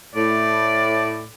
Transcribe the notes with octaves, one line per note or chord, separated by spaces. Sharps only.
A2 D5